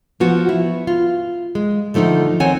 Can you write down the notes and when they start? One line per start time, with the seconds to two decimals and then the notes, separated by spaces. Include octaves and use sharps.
0.20 F3 B3 F#4
0.49 E4
0.87 F4
1.55 G#3
1.94 D3 F3 A3 D4 D#4
2.40 D#3 C4 C#5 F#5 G#5